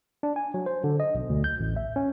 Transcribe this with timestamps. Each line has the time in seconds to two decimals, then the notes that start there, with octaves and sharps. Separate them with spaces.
0.23 D4
0.36 G#5
0.54 F#3
0.66 C5
0.84 D3
1.00 D#5
1.15 B1
1.30 D2
1.44 G6
1.60 A1
1.76 E5
1.96 C#4